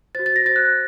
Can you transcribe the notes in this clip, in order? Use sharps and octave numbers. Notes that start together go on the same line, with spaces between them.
F#4 C5 A6
A6
A#6
F#4 C5 A6
F#6